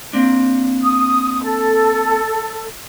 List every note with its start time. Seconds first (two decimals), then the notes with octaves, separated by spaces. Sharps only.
0.13 A#3 C4 D4
0.82 D#6
1.43 A4